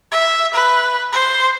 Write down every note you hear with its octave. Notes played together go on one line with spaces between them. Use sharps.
E5
B4
C5